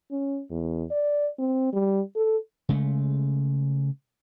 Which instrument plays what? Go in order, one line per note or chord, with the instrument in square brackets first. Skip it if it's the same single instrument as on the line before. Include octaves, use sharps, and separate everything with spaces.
[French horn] C#4
E2
D5
C4
G3
A4
[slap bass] C#3 G#3 A3